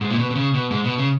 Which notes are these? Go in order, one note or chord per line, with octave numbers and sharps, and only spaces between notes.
G#2
A#2
B2
B2
C#3
B2
G#2
B2
C#3